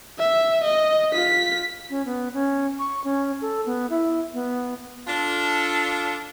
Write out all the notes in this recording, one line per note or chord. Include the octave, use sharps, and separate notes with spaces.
E5
D#5
F4 B6
C#4
B3
C#4
C#6
C#4
A4
B3
E4
B3
D4 F4 A4